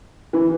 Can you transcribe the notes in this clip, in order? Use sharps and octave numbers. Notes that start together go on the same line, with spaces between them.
E3